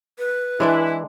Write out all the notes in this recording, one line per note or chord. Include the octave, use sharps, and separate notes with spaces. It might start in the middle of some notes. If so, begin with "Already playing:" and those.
B4
E3 G#3 D4 E4 D5